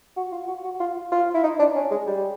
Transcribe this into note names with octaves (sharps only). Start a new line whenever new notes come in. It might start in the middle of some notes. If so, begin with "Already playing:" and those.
F#4
F4
F#4
F#4
F4
F4
E4
D#4
D4
C#4
G#3
G3